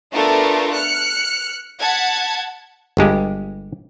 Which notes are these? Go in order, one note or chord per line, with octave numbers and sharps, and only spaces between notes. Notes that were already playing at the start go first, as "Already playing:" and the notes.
A3 B3 D4 F4 A4 A#4
F6 F#6 C#7
F#5 A5 G#6 B6
G1 G2 G#3 G4